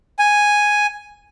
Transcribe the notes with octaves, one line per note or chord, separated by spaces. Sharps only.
G#5